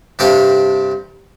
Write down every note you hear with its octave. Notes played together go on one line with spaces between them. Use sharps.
G2 C3 D4 G4 A4 F5